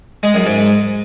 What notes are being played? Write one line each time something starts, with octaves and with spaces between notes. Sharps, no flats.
G#3
F#2
G#2